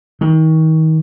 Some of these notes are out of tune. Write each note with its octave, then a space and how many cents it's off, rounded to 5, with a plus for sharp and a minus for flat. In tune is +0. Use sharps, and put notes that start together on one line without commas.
D#3 +35